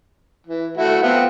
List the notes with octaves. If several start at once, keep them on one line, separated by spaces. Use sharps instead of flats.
E3
A3 E4 F#4
B3 C4 F4